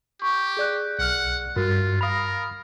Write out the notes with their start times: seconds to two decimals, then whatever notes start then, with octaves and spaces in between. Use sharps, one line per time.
0.22 G4 C#6
0.57 G#4 D5 F#6
0.99 B1 F#5 F6
1.56 G2 G3 F4 F#4 A#4
2.01 A#4 F5 B5 D#6 A#6 C7 F7